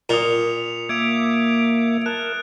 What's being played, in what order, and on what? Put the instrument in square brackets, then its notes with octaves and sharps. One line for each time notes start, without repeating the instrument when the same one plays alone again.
[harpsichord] A#2 [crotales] D#6 C#7 F7
[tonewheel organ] A#3 E5 D6 [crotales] G#6 D7 F7
[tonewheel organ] A#4 A5 [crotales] F#6